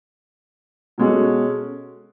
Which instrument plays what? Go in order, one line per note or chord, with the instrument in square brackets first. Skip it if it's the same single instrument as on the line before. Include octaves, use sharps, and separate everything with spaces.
[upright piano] B2 G#3 C#4 F#4 A4